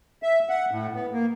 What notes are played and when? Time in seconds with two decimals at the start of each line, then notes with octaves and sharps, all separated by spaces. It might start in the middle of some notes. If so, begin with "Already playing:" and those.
0.23 E5
0.49 F#5
0.71 A2
0.94 B3
1.13 A#3